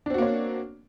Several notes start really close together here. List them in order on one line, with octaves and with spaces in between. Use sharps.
D4 C4 F#4 A#3 C#5